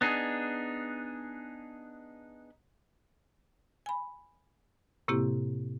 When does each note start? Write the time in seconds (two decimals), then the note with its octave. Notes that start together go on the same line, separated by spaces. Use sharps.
0.01 B3 D4 D#4 G#4
3.86 G#5 B5
5.08 A2 C3 A#3 C4 E4 G4